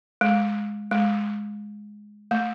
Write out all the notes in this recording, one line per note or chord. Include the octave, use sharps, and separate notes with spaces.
G#3
G#3
A3